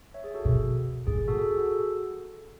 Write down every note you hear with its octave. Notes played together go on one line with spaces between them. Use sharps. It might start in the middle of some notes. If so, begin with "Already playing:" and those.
C#5 E5
G#4
F#4 A4
B2
A2 G#4
G#4
F#4 A4
A4
G#4
F#4 A4